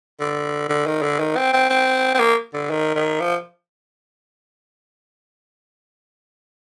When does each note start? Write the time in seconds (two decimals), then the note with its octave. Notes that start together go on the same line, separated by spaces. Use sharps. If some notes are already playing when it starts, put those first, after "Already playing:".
0.20 D3
0.69 D3
0.87 D#3
1.02 D3
1.20 D#3
1.36 C4
1.53 C4
1.70 C4
2.15 C4
2.19 A#3
2.54 D3
2.71 D#3
2.95 D#3
3.20 F3